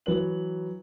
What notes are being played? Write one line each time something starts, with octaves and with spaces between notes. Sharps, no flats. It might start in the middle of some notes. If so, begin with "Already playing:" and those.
E3 F#3 B4 F#7